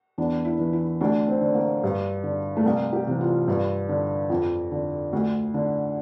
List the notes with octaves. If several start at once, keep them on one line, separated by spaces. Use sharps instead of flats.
E2 D4
E4
E3
E4
D2 D4
C4
D3
A#3
G2
D3
A3
C2 A#3
G4
C3 E3
F4
G2
D3
F2
D3
D2
D3